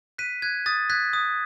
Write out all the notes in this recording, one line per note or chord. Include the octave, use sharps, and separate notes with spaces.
F#6 B6 D#7
F#6 G#6
D#6 A6
F#6 G#6 B6
D#6